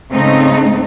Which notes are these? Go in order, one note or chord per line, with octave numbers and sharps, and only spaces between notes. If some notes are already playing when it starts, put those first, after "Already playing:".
G#2 C#3 A3 C4 D#4